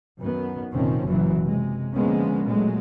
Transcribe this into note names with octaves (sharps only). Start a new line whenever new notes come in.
F#2 D#3 B3
F1 A#2 D#3 F3 C4 C#4
F#1 F#2 A#2 E3 F#3
C3 G#3
D3 F3 G#3 A#3 B3 C#4
A#2 F#3 G#3 A3